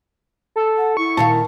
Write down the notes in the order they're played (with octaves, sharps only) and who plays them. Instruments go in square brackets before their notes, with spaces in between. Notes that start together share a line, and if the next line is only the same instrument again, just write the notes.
[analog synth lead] A4
[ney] F#5
[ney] E4 [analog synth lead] C#6
[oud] A#2 D#3 F5 [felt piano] A5